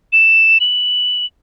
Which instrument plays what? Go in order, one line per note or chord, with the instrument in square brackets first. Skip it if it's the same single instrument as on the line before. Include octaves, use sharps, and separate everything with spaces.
[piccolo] E7
F#7